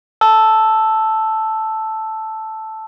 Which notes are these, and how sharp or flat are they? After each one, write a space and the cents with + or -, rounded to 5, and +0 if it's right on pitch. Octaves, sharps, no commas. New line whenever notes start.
A5 +0 E6 +0